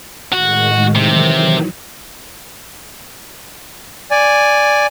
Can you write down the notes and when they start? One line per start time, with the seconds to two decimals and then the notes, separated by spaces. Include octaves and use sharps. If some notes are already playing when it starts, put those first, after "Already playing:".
0.33 A2 D#3 G#3 F#4
0.95 C3 D#3 E3 F#3
4.11 D5 G#5